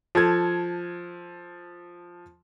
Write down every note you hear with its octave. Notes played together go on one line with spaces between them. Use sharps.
F3 A4 G#6